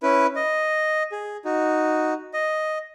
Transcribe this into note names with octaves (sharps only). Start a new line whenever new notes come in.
C#4 E4 B4
D#5
G#4
D#4 F#4
D#5